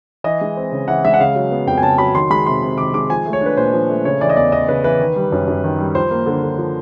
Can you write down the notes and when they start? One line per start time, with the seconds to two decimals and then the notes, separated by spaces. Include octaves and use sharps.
0.24 E3 D#5
0.41 G#3
0.57 C4
0.72 C#3
0.88 E3 F#5
1.05 G#3 E5
1.14 F#5
1.19 C#3 F5
1.35 F#3
1.51 B3
1.67 F2 G5
1.78 G#5
1.83 C#3 A5
1.98 F#3 B5
2.15 D#3 C6
2.30 G#3 B5
2.46 C3 C6
2.62 C3
2.78 D#3 D6
2.94 G#3 D6
3.09 F3 G#5
3.26 A3
3.33 C#5
3.42 D4 B4
3.57 A#2 C5
3.73 F3
3.89 A3
4.05 C#3 C#5
4.21 E3 D5
4.29 D#5
4.36 E2 D5
4.52 E2 D#5
4.69 C#3 B4
4.84 E3 B4
4.99 D#3
5.16 G3
5.32 F#2
5.48 F#2
5.64 D#3
5.78 G3
5.95 F3 C5
6.11 A#3
6.26 D3
6.42 D3
6.58 F3